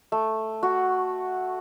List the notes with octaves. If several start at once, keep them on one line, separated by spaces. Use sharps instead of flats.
A3
F#4